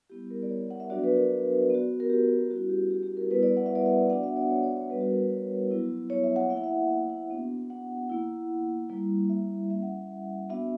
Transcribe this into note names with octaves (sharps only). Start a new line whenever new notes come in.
G3 B3 E4 G4
A#4
D5
C#5
F#5
E5
F#3 B3 D4 F#4 D5
B4
A#4
B3 F#4
A#4
G4
G3 C#4 E4 F#4
G4
G4
G4
A#4
G3 B3 E4 B4
D5
F#5
E5
D5
E5
B3 D4 F#4 F#5
E5
D5
C#5
C#5
C#5
G3 B3 D4 B4
F#4
A#4
B4
C#5
F#3 B3 E4
C#5
E5
F#5
A#3 E4 E5
F#5
E5
E5
F#5
B3 D4 F#4
F#5
A#3 E4
G3 A#3 E4
E5
G3 C#4 E4 E5
F#5
B3 D4 F#4 E5